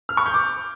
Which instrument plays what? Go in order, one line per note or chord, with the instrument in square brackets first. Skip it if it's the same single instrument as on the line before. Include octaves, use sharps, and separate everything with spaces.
[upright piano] F6
C#6
G6
D6